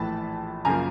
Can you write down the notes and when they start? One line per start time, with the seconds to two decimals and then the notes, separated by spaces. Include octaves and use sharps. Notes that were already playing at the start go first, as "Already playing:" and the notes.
Already playing: A#1 A2 E3 A5 B5
0.65 F#2 C#3 F3 A#3 G#5 A#5